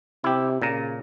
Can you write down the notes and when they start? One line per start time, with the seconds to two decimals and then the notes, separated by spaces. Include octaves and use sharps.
0.24 C3 E4 G4
0.62 A#2 C#3 A#5